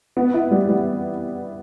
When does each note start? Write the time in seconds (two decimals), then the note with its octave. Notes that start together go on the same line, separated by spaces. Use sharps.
0.17 B3
0.34 E4
0.51 G3
0.68 G3